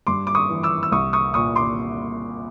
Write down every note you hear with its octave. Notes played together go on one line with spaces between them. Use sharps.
G2 C6 D6
D6
C#6 D#6
E3
D6 E6
E6
C2 C#6 D#6
C#6 D#6
A#2 C#6 D#6
C6 D6